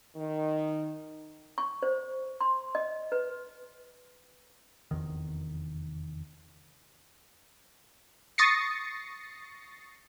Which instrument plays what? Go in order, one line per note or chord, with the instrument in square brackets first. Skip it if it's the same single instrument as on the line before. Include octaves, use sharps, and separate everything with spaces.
[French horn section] D#3
[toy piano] C#6
C5
C6
D#5
B4
[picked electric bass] F1 B1 E2 D#3
[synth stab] C#6 D#6 A6 A#6 C7 C#7